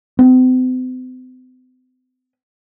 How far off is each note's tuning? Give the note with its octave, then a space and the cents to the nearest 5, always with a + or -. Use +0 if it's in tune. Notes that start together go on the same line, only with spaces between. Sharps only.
C4 -45